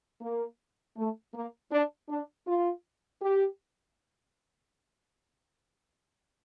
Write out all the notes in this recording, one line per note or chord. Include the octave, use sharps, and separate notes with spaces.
A#3
A3
A#3
D4
D4
F4
G4